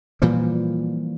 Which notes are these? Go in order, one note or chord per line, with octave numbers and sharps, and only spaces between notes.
A#2 E3 F3 G3